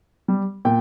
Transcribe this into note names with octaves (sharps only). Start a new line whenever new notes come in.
G3
A#2 G5